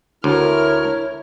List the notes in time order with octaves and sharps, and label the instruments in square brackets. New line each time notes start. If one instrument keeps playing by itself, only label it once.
[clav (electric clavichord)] D2 [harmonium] E4 [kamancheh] A#4 F6 [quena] C#5